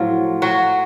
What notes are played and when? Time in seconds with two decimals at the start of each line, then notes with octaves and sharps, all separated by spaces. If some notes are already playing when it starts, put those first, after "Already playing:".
Already playing: A2 F3 F#3 F4
0.42 F#3 F#4